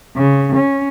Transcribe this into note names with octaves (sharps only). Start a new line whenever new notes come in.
C#3
C#4